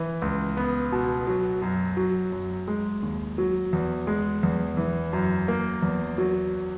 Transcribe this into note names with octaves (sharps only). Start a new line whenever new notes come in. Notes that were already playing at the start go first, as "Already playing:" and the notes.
Already playing: E3
C#2
B3
B2
F#3
F#2
F#3
F#2
G#3
D#2
F#3
E2
G#3
E2
E3
F#2
A#3
E2
F#3